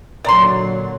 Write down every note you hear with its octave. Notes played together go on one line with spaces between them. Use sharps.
A#2 D3 F#3 D5 A#5 C6